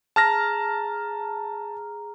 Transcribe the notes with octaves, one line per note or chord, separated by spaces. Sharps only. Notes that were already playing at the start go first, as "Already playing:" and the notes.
G#4 A5 A#5 F6 A#6